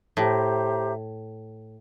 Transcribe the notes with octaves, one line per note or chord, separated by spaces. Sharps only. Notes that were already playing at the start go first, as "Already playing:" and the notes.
A2 G4 C5 E5 A#5